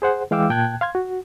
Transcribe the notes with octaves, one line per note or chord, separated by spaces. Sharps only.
G#4 C5 F#5
E3 G#3 F5 G5 D6 E6
A#2 G5 A5 F#6 G#6
F5 C6 G#6
F#4